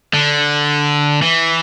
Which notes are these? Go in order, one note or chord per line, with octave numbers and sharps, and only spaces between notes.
D3
E3